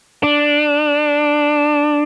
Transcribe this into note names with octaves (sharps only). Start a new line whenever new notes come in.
D4